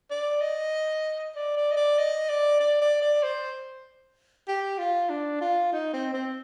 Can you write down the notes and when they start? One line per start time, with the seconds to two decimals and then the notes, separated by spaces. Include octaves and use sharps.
0.10 D5
0.41 D#5
1.36 D5
1.57 D5
1.72 D#5
1.76 D5
1.98 D#5
2.29 D5
2.60 D5
2.81 D5
3.02 D5
3.23 C5
4.48 G4
4.78 F4
5.09 D4
5.41 F4
5.73 D#4
5.93 C4
6.13 C4